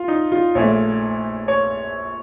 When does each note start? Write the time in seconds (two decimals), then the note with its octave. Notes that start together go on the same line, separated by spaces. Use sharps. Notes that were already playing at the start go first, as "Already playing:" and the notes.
Already playing: F4
0.08 D#4
0.32 F4
0.55 A#1 A#2 A3 C#5
1.48 C#5